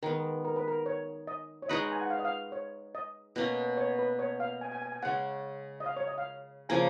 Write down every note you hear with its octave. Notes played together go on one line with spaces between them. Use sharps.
D#3 G#3 B3 A#4
A#4
B4
A#4
C#5
D#5
C#5
G#3 D#4 F#4 B4 D#5
A#5
G#5
F#5
F5
D#5
F5
C#5
D#5
B2 A#3 C#4
C#5
B4
C#5
F5
G#5
G#5
G#5
G#5
C#3 G#3 C#4 F#5
D#5
F5
C#5
D#5
F5
C#3 F3 A#3 G#5